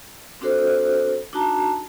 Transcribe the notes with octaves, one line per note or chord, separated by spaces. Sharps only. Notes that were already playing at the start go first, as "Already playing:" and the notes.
C4 D4 F#4 A4 C5
D4 D#4 F#4 A5 A#5